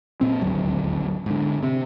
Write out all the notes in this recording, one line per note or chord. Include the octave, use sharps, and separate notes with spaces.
A#2 C4
D#1 G#1 D2 F#3
G#2 D3
C3